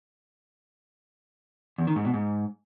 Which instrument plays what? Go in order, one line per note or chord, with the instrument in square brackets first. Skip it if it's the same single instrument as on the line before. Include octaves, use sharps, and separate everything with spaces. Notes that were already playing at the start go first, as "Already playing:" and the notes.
[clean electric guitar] E2
D#3
G#2
B2
G#2